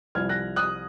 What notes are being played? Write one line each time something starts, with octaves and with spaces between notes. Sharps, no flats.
C2 C3 F3 F6 G#6
F#6 A#6
D#6 F#6